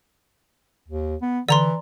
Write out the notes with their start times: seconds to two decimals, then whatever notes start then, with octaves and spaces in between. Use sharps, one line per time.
0.88 D#2
1.22 B3
1.49 D3 E3 D5 A#5 C6